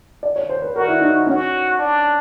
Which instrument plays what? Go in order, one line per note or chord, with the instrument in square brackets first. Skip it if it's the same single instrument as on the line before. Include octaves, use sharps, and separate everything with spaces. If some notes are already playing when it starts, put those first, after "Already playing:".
[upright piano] D5
C#5
C5
B4
[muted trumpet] F#4 [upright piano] A#4
[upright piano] E4
D#4
[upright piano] C#4 [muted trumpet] F#4
[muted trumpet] D4